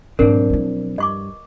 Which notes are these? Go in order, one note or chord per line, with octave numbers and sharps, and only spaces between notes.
B1 G#2 E3 C4 D4 A#4
F3 E4
G2 D#5 C#6 D6